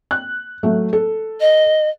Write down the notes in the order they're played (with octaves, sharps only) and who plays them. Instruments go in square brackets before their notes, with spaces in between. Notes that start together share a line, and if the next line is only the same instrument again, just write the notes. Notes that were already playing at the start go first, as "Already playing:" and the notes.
[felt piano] F#6
F#3 A3
A4
[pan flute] D#5